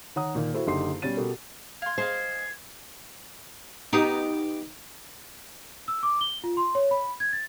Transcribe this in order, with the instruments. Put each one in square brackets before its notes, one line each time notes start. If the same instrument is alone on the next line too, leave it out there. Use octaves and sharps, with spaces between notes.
[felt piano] D#3 C#5 F#5 A#5 D#6
A#2 D#3 A#3
E4 F#4 A4 C5
F#1 D3 D#4 G4 C6 C7
B2 G3 C#4 A6 D#7
B2 B3 F#4 G4 A4 A#4
[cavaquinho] F5 C6 [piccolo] G#6
[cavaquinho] G#4 D#5 F5 [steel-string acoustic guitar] C5
[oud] B3 D#4 [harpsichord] G4 G5
[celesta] E6
D6
G7
F4
C6
C#5
B5
G#6
A6